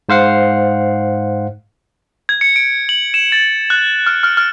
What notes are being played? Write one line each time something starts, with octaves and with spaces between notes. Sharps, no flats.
G#2 C5 F5 F#5 C7
G#6
C#7
D7
F#7
E7
A6
F#6
F6
F6
F6